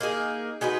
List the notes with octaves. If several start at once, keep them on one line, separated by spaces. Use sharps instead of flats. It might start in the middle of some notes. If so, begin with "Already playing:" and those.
A#3 D#4 G#4
G#3 D#4 F#4 B4